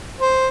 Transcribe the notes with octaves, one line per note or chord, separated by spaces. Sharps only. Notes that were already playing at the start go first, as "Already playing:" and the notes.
C5